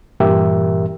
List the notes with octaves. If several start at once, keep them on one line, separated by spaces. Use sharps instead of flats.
G2 A#2 E3 G4 A#4 E5